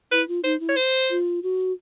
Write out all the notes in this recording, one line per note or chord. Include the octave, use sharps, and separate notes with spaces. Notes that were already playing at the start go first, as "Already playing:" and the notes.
E4 B4
F4
D#4 C5
E4
C#5
C5
F4
F#4